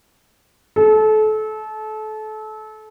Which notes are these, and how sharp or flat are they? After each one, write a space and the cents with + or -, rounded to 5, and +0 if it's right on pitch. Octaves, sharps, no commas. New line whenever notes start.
A4 -30